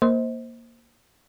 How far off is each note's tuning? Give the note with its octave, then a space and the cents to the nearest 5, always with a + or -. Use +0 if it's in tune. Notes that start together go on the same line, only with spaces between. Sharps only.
A#3 +0 C5 +0 D#5 +40